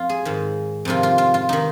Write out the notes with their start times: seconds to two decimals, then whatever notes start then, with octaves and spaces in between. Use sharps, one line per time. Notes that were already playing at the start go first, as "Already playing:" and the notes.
Already playing: F2 F4
0.09 G#4
0.25 G#2 D#3
0.85 F2 C3 D#3 F4
1.03 F4
1.18 F4
1.34 F4
1.49 D#3 D#4